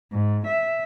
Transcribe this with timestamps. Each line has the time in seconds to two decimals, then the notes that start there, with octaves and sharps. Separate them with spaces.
0.13 G#2
0.47 E5